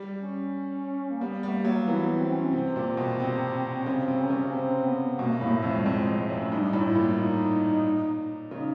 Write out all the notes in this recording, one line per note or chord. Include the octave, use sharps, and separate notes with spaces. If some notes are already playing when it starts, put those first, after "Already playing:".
Already playing: G3
C#4
A#3
G3 B3
G3 A3
A#3
F#3
E3 B3
C4
C#4
C4
C3
A#2
B2
C3
C#4
C#3 C4
C3
C4
C#4
C#3
C3 C4
B3
B2 A#3
A3
A2 A#3
A3
F2
G3
F2 G#3
F2 G#3
A3
F#2
G2 D#4
D4
A2 D#4
F4
E4
A#2
E4
D#4
C#3 D#4